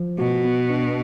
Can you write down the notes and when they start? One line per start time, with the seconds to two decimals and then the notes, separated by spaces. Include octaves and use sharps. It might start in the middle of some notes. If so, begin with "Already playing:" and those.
Already playing: F3
0.19 B2 F#4
0.45 B3
0.70 D4